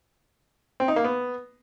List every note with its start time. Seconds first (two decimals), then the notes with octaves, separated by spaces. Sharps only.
0.80 C4
0.88 D#4
0.96 A#3
1.05 B3